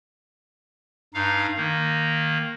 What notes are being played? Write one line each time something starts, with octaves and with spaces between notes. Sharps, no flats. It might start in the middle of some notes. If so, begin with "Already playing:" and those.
G2 D#4 F5
D#3 A#3